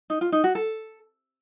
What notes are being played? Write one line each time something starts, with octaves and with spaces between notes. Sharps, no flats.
D#4
F4
D#4
F#4
A4